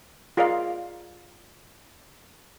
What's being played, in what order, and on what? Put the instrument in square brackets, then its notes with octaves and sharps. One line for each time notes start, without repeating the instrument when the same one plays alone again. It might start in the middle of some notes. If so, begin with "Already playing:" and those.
[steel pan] F4 G#4 A#4 D5 D#5 F5